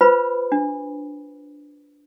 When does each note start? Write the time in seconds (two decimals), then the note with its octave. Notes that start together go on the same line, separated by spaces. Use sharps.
0.01 F4 B4 C5 B5
0.52 D4